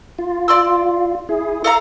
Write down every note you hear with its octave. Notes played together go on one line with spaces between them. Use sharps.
F4
D5 C6 E6
E4 G#4
A4 F5 A#5